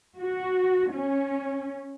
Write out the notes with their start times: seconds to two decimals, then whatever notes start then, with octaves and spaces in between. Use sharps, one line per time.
0.19 F#4
0.91 C#4